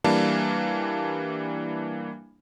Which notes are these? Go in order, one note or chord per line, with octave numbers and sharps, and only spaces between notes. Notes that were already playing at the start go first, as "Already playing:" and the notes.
E3 G3 A#3 D4 F5 A5